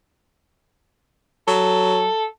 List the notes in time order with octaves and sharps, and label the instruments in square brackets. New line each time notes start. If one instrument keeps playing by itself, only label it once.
[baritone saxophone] F#3 [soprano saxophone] A4